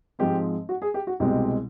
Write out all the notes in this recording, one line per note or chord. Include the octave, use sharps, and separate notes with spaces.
G#2 F3 G#3 C4 G4
F#4
G#4
G4
F#4
C2 B2 G#3 C4 G4